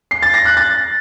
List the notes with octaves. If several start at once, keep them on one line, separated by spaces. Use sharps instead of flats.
C7
A6
A#6
F#6
A6